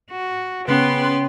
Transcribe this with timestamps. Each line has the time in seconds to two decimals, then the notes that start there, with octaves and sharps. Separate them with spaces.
0.11 F#4
0.68 C#3 B3 C#4 B4 G5 C6